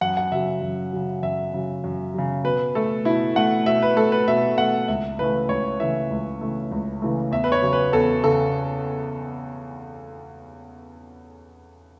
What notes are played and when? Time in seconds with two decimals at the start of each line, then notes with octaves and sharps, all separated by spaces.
0.01 F#2 F#5
0.17 F#5
0.32 C#3 F#3 E5
0.62 F#2
0.93 C#3 F#3
1.23 F#2 E5
1.53 C#3 F#3
1.84 F#2
2.14 C#3 F#3
2.44 B2 B4
2.75 A3 A4
3.05 B2 E4
3.36 A3 F#5
3.66 B2 E5
3.82 B4
3.97 A3 A4
4.12 B4
4.28 B2 E5
4.58 A3 F#5
4.88 C#2 E5
5.19 C#3 E3 A3 B4
5.49 C#2 C#5
5.80 C#3 E3 A3 E5
6.10 C#2
6.41 C#3 E3 A3
6.71 C#2
7.02 C#3 E3 A3
7.31 E2 E5
7.44 B4
7.52 C#5
7.62 C#3 F#3
7.73 B4
7.92 E2 A4
8.24 C#3 A4